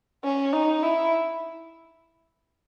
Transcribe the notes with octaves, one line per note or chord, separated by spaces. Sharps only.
C#4
D#4
E4